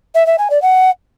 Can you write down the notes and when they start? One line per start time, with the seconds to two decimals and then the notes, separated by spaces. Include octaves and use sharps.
0.15 E5
0.27 E5
0.38 G#5
0.50 D5
0.62 F#5